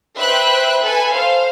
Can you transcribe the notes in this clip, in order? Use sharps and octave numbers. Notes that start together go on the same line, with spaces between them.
B4 C5 E5 G5 F#6
A4 B4 G#5
C5 F5